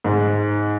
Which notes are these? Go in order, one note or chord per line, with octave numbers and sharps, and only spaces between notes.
G#2